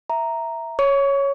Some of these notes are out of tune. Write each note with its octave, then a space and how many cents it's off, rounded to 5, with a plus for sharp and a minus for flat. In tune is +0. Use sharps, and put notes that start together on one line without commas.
E5 +0 A#5 +0
C#5 +0 C#6 +30